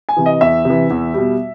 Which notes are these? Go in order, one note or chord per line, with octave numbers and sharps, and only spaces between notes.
G#5
C3 E3
D#5
E2 E5
C3 E3
E2
B2 G3